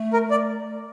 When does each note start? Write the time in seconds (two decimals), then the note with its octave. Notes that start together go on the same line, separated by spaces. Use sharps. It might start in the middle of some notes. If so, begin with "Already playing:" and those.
Already playing: A3
0.13 A#4
0.31 D5